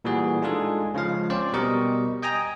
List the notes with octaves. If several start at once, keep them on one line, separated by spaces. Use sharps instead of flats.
A#2 E3 G3 F#4 G#4
G#3 D4 D#4 F4 G#4 A4
C#3 F3 G#3 F5
C4 C#4 C5 D5
B2 G3 A#4 D#5 C#6
D#5 G5 G#5 A#5 D#6 A#6